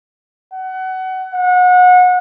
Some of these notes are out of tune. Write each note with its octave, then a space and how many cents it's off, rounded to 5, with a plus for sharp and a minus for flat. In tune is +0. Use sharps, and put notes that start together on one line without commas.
F#5 +25
F#5 -30